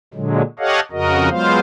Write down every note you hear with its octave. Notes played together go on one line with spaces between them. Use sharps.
A#2 D3 F#3 G#3
G4 A4 C#5 D#5 F5 F#5
F2 C#3 F#4 A#4 D#5
F#3 G#3 B3 F4 C5 F5